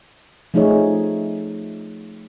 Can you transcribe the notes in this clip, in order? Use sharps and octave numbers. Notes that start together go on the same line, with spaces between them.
F3 A3 D#4 G#4 C#5